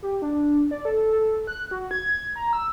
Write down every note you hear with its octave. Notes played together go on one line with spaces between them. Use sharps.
G4
D4
D5
A4
A4
F#6
F#4
G#6
A#5
E6